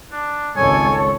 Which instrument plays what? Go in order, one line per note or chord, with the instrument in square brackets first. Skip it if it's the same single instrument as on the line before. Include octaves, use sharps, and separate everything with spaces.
[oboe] D4
[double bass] G#1 C#2 [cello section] G#2 A4 C#5 [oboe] G#5